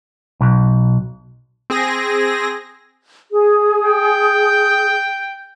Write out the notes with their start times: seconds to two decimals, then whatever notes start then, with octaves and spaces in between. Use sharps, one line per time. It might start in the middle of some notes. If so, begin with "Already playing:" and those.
0.41 B1
1.70 C4 G#4 A#6
3.32 G#4
3.85 G5